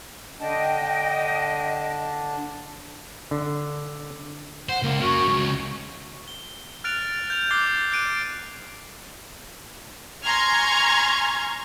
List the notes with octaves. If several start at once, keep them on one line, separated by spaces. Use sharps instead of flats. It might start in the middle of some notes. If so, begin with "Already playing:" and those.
D3 D4 D#5 G5 A5
D3
C5 F#5
C#2 A#3
C#4 F#4 A#4
C#2 G#2
G7
F6 F#6 A6 D7 F7
G6 F7
D6 F#6 G#6 A6 C7 G7
F#6 A6 D7 D#7
G#5 A#5 C6 C#6 F6 G#6